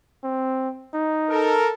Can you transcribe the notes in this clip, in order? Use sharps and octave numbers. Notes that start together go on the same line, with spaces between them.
C4
D#4
A4 A#4